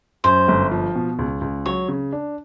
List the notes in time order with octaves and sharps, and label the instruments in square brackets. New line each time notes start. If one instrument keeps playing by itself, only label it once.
[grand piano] F#2 [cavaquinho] C5
[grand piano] G1
F3
B2
C#2
C#2
[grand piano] F#3 [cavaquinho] C#5
[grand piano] C#3
D4